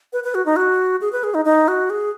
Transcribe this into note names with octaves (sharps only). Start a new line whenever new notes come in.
B4
B4
F#4
D#4
F#4
G#4
B4
G#4
D#4
D#4
F#4
G#4